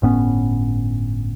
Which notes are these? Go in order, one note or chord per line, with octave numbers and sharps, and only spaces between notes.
G1 A2 B3 C#4